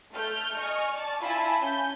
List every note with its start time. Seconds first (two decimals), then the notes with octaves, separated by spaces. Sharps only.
0.13 A3 F6 G6
0.56 D#5 G#5 C#6 F6
0.90 D5 A5
1.21 E4 F4 E5 G#5 A5 B5
1.59 C#4 G6